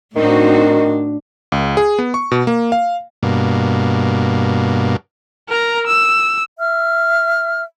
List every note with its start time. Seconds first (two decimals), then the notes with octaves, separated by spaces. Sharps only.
0.16 A2 D#3 C4 D4 D#4 F#4
1.52 C#2
1.77 G#4
1.99 B3
2.14 C#6
2.31 B2
2.47 A#3
2.72 F5
3.23 G2 B2 A#3
5.49 A#4 A#5
5.87 E6
6.58 E5 F6